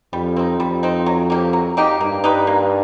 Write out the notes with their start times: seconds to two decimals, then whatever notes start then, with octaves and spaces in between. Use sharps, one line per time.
0.13 F2 G3
0.37 C4 D#4
0.60 F2 G3
0.83 C4 D#4
1.06 F#3
1.30 A#3 D#4 G4
1.53 F#3
1.77 A#3 D#4 G4
2.01 G2 A#3
2.24 D#4 G4 B4
2.47 A#3